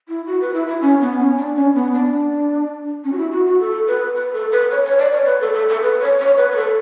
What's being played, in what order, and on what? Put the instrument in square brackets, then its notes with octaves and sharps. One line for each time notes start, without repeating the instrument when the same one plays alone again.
[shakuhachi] E4
F#4
B4
E4
E4
C#4
B3
C#4
D4
C#4
B3
D4
C#4
F#4
E4
F#4
F#4
A4
B4
B4
A4
B4
C#5
C#5
D5
C#5
B4
A4
A4
A4
B4
C#5
C#5
B4
B4
A4